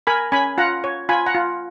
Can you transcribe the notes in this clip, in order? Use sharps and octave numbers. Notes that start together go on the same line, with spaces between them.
A#4 G#5 B5
C#4 G#5 B5
F4 F#5 A#5
C#5
F4 G#5 B5
F#5 A#5
F4